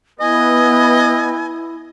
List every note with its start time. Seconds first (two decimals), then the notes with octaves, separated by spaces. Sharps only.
0.20 B3 E4 D#5 G#5